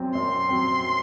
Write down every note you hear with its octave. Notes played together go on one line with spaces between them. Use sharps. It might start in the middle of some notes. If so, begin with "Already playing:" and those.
Already playing: F#2 F#3 C4
F#2 C6
F#3 C4